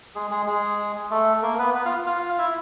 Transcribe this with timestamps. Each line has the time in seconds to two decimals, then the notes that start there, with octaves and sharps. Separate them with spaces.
0.15 G#3 G#4
0.31 G#3 G#4
0.47 G#3 G#4
1.11 A3 A4
1.42 A#3 A#4
1.59 B3 B4
1.75 B3 B4
1.85 F4 F5
2.07 F4 F5
2.39 E4 E5